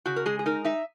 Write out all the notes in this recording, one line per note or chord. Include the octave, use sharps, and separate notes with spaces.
C#3 F#4
A#4
G#3 G#4
G#4
D#4 A#4
D#4 E5